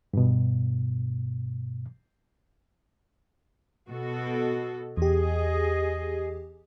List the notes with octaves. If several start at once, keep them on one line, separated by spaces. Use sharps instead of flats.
G2 B2
B2 F#4 A4
E2 G4 G#4 D#5